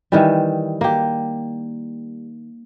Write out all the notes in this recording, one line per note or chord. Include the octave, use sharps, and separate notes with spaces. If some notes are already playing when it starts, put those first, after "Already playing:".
D#3 E3 G3
A#3 G4